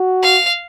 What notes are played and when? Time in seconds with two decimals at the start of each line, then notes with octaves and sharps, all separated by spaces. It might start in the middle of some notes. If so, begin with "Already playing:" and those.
Already playing: F#4
0.23 F5